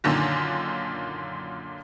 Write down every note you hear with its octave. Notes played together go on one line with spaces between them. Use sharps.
F#2 A#2 D3 D#3